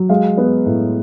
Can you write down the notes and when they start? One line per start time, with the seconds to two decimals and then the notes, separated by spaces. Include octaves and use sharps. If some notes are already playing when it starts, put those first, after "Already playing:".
Already playing: F#3
0.09 G#3 F5
0.38 B3
0.66 A2